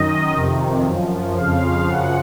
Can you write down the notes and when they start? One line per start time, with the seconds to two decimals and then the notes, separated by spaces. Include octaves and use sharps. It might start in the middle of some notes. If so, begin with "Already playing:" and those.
Already playing: F#2 D#3 D#5
0.34 F2 C3 D#3
0.85 F#2 F3
1.36 F2 C#3 F3 F5
1.87 F#2 C#3 F3 F#5